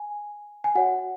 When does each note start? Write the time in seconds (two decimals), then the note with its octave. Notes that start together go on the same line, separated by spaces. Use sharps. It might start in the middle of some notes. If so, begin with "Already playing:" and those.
Already playing: G#5
0.64 G#5
0.75 F#4 C#5 F#5